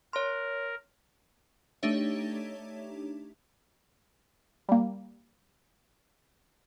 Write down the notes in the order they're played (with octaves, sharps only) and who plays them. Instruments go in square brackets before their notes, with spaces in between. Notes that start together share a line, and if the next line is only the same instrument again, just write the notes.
[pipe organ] A#4 [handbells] C#5 C6
[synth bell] A3 D4 D#4 G4 C#5 E5
[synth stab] G3 A#3